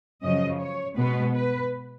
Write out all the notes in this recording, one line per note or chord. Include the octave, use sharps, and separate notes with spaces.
F#2 C#3 F3 D#5
C#5
B2 G#3 B3 B4
B4